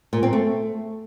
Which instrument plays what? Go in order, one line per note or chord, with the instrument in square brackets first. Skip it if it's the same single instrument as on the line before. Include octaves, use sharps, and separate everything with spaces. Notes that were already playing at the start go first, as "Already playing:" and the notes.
[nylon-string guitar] A#2
C4
A3